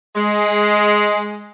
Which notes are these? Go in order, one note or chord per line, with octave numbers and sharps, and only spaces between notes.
G#3